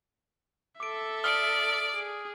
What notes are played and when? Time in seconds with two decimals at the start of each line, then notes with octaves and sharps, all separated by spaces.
0.80 A4 E5 D6 D7
1.24 D5 D#6 F6 G7
1.94 G#4